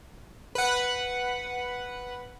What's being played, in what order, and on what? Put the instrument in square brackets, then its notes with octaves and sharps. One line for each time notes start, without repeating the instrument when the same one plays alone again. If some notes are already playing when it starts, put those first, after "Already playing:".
[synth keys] B4 F#5